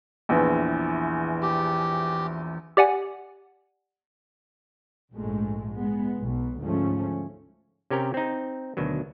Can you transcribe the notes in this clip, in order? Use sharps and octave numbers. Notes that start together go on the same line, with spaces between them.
A#1 E2 E3
G4
G4 D5 F#5 G#5
A#1 G#2 G#3 A3
G#3 B3
B1 B2
D2 G#2 F3 A3 C#4
C3 C#4 G4 A#4 G5
C4 D#4
D2 B2 D#3 F#3